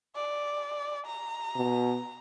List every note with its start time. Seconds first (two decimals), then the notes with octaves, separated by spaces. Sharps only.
0.16 D5
1.07 A#5
1.56 B2